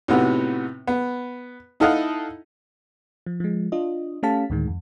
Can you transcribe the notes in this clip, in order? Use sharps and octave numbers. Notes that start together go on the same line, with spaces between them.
A2 C3 B3 D#4 F#4
B3
D#4 E4 A4 D#5 F5 F#5
F3
F3 G#3
D4 F4 D#5
A3 C#4 G4 F5 A5 B6
D2 A2 D#3 G#3
F2